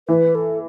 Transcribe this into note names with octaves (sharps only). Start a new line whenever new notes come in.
E3 B4
A4